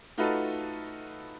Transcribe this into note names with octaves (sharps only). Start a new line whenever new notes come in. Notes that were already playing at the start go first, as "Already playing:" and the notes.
A3 D#4 F4 F#4 A4 B4